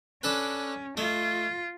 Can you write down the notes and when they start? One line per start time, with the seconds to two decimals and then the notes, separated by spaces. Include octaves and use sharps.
0.23 C#4 D4 A4 B4
0.97 A3 F4 D#5